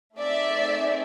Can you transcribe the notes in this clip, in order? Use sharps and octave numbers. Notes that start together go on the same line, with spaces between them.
A3 C4 D#4 G#4 D5 E5